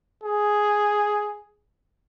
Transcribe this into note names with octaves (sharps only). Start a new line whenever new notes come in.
G#4